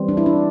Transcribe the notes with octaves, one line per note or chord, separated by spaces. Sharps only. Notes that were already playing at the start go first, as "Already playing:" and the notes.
Already playing: E3 G3 C4
D4
E4
D4